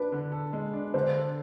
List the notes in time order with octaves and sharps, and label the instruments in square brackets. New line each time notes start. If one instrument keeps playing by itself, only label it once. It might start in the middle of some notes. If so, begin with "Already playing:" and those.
Already playing: [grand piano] D4 [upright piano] B4
[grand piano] D3
A4
G#3
D4
[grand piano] D3 [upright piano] C5
[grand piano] A4